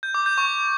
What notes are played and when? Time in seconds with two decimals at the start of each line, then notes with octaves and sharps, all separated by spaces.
0.03 G6
0.15 D6
0.26 G6
0.38 C#6